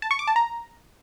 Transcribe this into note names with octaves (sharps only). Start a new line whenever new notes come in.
A5
C#6
D6
A5
A#5